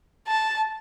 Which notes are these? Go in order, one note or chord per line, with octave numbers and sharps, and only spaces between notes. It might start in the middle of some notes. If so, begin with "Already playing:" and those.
A5